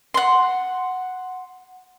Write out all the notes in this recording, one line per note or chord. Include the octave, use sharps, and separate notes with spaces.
F#5 C6